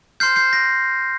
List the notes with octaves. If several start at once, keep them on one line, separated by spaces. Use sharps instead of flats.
C6 F6 G6 C7
G6 C7
A#6